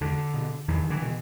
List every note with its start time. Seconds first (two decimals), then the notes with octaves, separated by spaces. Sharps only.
0.01 E2 D3
0.34 B2
0.68 E2 D#3
0.90 D3 E3
1.02 B2